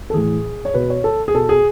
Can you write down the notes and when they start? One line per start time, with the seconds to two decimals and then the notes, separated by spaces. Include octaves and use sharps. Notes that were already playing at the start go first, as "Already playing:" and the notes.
0.10 A4
0.14 A2 E3 G#4
0.65 C#5
0.74 B2 B4
0.90 C#5
1.04 A4
1.28 G#4
1.35 B2 A4
1.49 G#4